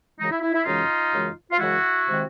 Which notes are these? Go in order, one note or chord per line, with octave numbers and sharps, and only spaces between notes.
F#2 C#3 E3 G#3 D#4
E4
E4
E4
F#2 C#3 E3 G#3 D#4 F4
F#2 C#3 E3 G#3
F4
F#2 C#3 E3 G#3 E4 F#4
C3 D#3 G#3 C4